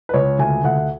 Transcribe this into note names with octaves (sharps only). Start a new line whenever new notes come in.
B4
C#2 C#5
D2 G#5
D2 F#5